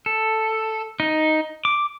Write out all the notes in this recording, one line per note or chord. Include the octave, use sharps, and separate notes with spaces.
A4
D#4
D6